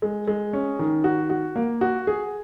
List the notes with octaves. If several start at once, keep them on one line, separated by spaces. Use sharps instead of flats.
G#3
G#3
C#4
D#3
F#4
F#4
A#3
F#4
G#4